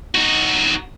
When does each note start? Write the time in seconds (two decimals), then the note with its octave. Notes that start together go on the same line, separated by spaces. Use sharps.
0.15 D#4 F#4